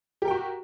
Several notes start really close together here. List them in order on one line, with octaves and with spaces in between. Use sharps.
G4 A#4 G5 F#4